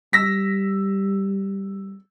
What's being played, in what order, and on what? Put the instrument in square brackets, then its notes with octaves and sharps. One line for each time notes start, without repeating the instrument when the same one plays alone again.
[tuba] G3 [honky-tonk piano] E6 A#6 B6